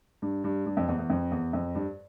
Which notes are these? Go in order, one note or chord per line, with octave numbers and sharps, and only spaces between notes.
G2
G2
G2
F2
E2
E2
F2
E2
F2
G2